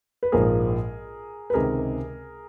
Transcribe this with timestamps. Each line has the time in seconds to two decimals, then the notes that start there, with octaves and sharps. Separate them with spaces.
0.23 B4
0.32 A#1 G#2 F3 A#3 G#4 A#4
1.50 B4
1.54 C#2 C3 D#3 G#4 A#4